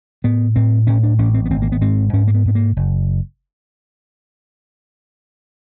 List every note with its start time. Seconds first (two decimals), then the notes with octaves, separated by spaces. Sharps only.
0.24 A2 B3
0.56 A2 C4
0.87 A2 C#4
1.03 D4
1.18 A1 C#4
1.34 C4
1.45 B3
1.50 G#1 C4
1.62 A#3
1.72 B3
1.81 G#2 C4
2.13 G#2 C#4
2.28 A#3
2.35 B3
2.45 G#2 B3
2.55 A#3
2.76 F#1